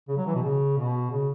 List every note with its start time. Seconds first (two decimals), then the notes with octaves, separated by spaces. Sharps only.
0.08 C#3
0.17 F#3
0.26 E3
0.34 B2
0.43 C#3
0.77 B2
1.11 C#3